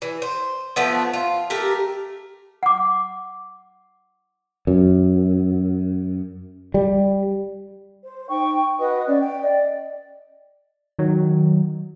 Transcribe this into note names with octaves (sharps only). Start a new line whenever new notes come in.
E3
C5
F3 A3 B3
F4
A3 G4 A#4
F#5 D6
F#2
G3
C5
D#4 G5 C#6
F#4 B4 D#5 D#6
C#4 D5
G5
D5 D#5
D#3 F#3